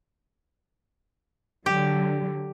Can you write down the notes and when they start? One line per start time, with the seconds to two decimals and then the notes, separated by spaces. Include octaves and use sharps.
1.66 D3 F#3 G4